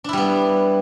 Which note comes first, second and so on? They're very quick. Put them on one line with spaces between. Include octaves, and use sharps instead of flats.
D4 E4 G3 B3